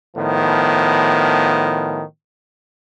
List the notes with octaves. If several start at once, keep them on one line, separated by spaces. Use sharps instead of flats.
A2 D#3 F3 B3